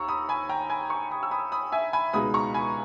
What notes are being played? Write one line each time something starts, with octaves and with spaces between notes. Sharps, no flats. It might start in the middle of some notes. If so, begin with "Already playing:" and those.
Already playing: D#2 A#5 C#6 E6
B5 D#6
G#5 B5
G5 A#5
G#5 B5
A#5 C#6
B5 D#6
E6
B5 D#6
B5 D#6
E5 G#5
G#5 B5
C#2 B2 G#3 D#4 B5 D#6
A#5 C#6
G#5 B5